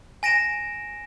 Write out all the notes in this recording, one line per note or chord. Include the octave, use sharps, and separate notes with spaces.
G#5 A#6 D7 E7